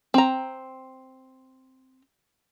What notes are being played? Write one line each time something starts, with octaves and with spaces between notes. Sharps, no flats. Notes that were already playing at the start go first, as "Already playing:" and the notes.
C4 A#5